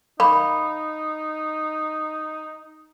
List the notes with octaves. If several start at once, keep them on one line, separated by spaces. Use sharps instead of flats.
A#3 D#4 B5